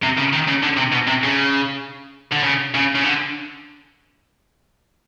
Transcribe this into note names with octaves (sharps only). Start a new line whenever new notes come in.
C3
C#3
D#3
C#3
D3
C3
B2
C3
C#3
D3
C#3
C#3
C#3
D3